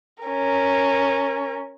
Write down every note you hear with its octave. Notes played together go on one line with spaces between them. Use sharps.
C#4 A#4